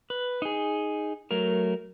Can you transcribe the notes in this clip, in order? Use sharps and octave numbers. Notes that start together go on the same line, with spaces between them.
B4
D#4 G#4
F#3 A3 A#4